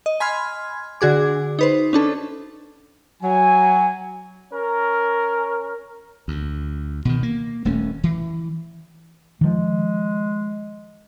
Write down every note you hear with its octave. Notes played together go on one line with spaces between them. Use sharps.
D#5
G#5 B5 C6 F6 G#6
D3 F#4 G#4 D6
D#4 B4 C5
C#4 D4 A4
F#3 G#5
C#4 A#4
D2
B2 D3 D#3
A#3
D#1 A3 A#3 C#4
E3
D#3 F3 G#3